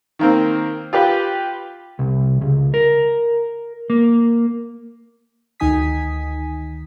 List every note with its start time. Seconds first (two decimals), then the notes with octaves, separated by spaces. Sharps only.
0.19 D#3 A#3 C4
0.93 F4 G4 B4
1.99 C2
2.41 C#2
2.74 A#4
3.90 A#3
5.60 D2 D#3 D#4 G#5 D#6 B6